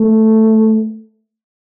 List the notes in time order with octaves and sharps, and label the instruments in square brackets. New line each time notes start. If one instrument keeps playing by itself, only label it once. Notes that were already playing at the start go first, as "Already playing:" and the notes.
Already playing: [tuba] A3